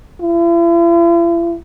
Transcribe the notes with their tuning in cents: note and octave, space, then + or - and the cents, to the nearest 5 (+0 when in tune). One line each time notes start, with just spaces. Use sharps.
E4 +45